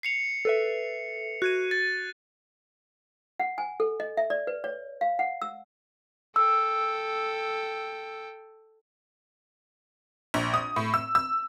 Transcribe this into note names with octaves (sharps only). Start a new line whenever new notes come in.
C7 C#7 F7
A4 B4 E5
F#4 F#6 G#6 D#7
A6
F#5
G#5
A4
D#5
E5
D5
B4
C#5
F5
F#5
E6
A4 G5 E6
A#1
D#6
A2
E6
E6